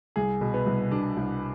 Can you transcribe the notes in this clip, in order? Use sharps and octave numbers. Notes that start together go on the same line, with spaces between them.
C2 G#4
B2
B3
C2
B2 D4
C2